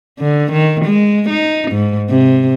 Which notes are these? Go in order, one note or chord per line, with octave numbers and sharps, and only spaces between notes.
D3
D#3
G#3
D#4
G#2
C3